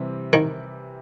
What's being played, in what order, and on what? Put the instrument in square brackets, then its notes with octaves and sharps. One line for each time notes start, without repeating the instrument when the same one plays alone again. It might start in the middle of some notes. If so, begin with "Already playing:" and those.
Already playing: [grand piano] C3 E3 G3 C4
[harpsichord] D#3